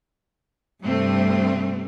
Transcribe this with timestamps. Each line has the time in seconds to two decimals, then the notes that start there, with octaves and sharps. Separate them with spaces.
0.84 G2 C3 A3 C4